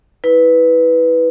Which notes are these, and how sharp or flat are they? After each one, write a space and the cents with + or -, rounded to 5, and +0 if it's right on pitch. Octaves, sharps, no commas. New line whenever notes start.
E4 -20 B4 +0